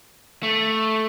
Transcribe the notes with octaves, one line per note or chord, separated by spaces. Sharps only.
A3